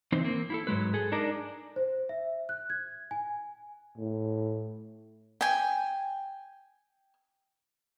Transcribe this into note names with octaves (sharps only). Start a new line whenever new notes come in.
E3 C4 D#4 C5
A#3 C4
E4 F4 A4
G#2 F#3 G#3 B4
G#4 A4
D4 D#4 G#4 A#4 D5
C5
E5
F#6
G#6
G#5
A2
G5 G#5